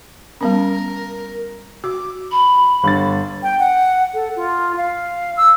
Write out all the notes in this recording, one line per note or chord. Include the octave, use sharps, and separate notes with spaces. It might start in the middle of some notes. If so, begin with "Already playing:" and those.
G3 B3 C#4 A#4
F#4 D6
B5
G1 A6
G5
F#5
A4
F4
F5
E6